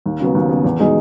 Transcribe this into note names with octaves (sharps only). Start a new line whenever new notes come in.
D#2
C#3 F#3 B3
D#2
C#3 F#3 B3
E2
B2 G#3 D#4 G#4